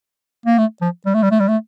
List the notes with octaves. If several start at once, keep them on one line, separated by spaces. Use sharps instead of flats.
A#3
A3
F3
G3
A3
G3
A3
G3
A3